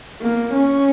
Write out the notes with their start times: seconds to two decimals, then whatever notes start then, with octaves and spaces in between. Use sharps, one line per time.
0.22 A#3
0.53 C#4